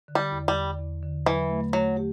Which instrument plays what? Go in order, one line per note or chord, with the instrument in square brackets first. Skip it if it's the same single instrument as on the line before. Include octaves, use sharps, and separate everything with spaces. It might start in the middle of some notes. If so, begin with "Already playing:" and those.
[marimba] D3
[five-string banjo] G3
[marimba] E2
[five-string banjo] G3
[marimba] E2
E2
D3
[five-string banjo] E3 [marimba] F#3
[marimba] A3
[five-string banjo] F#3 [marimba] A3
[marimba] G4